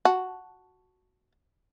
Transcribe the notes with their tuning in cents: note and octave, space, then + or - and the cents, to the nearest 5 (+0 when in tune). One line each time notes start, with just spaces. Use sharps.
F#4 +0 A5 +0